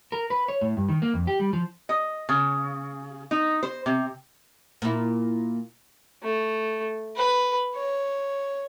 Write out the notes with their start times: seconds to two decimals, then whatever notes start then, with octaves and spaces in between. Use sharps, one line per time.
0.12 A#4
0.30 B4
0.48 C#5
0.61 A2
0.77 G2
0.89 D#3
1.02 A#3
1.14 F2
1.27 G4
1.40 G3
1.53 F3
1.89 D#5
2.29 C#3
3.31 D#4
3.63 C5
3.86 C3
4.82 A#2 E4
6.23 A3
7.16 B4
7.75 C#5